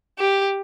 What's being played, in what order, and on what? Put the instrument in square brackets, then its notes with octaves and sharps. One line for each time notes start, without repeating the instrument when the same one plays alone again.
[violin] G4